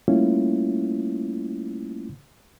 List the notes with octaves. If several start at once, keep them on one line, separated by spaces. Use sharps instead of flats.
G3 A3 A#3 C#4 E4 F4